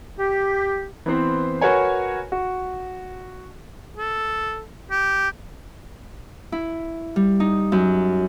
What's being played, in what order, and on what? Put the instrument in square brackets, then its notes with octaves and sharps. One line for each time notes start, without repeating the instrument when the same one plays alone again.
[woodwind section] G4
[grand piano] E3 B3 C4 C5
F#4 A#4 B4 C#5 G#5
F#4
[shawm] A4
G4
[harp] E4
G3
D#4
F#2